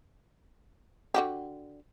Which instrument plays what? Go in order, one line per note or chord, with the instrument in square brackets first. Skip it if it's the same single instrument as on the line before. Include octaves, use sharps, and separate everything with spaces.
[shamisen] D3 F#4 G4